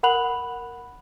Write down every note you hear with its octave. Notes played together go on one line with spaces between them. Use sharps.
A#4 F#5 B5 F#6 F7 F#7